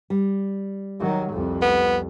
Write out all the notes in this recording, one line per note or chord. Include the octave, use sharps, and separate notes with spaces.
G3
D#3 F#3
C2 F2
B3